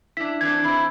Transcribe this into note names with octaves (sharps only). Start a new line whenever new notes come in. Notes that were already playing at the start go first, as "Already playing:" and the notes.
D4 E4 B6
E3 C4 D4 G#6
E3 C4 E4